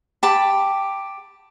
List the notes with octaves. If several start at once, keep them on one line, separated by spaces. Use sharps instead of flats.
G4 A5 B5